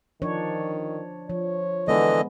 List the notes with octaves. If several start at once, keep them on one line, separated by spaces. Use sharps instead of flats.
D#3 F3 D4 C#5
F3 C#5
D3 E3 G#3 B3 D#5